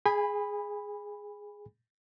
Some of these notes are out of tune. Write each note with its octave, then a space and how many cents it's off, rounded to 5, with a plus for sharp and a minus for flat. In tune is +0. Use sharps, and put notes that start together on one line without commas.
G#4 +0 G#5 -35 B5 +0